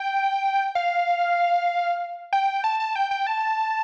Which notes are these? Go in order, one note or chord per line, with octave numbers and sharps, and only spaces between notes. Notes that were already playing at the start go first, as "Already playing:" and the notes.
Already playing: G5
F5
G5
A5
A5
G5
G5
A5